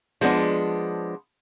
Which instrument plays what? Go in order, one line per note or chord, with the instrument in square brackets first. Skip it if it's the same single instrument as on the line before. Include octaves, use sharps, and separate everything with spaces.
[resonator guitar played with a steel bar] F3 G#3 B3 D4